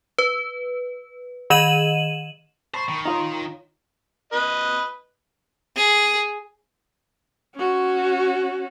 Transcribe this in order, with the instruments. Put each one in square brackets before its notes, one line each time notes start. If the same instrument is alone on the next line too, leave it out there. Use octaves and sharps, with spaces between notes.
[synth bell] B4
D#3 D#5 D#7 E7 F#7
[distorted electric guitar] C5 [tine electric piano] A5 B5 C#6
[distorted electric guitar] D#3
[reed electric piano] D#4 F4 C#5 [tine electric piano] A#5 C6
[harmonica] B4 D#5
[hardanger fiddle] G#4
[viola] C#4 F#4